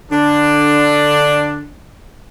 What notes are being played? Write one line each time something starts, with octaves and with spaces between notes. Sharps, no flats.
D3 D4